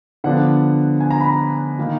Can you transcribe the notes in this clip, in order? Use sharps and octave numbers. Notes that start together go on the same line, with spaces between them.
D3 F3 B3 D4 F#5
G#5
A#5
B5
A#5
D#3 A#3 D#4